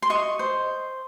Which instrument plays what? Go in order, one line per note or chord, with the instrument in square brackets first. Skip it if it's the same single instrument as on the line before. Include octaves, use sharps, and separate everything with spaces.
[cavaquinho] C6
D#5 C#6
C5